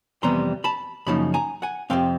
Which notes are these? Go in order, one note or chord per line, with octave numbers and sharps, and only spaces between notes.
F2 C3 E3 G3 B3 A#5 C6
A5 B5
F#2 C#3 F3 A#3 D#4 A5 B5
G#5 A#5
F#5 G#5
F2 C3 F3 A3 C4 F5 G5